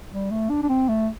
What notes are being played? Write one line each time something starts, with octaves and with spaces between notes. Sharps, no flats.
G3
A3
D4
D4
C4
A3